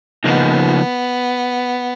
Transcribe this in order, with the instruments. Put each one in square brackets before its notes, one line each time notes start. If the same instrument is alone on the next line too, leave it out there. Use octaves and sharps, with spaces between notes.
[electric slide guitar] C#3 F3 A#3 D#4 [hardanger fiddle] B3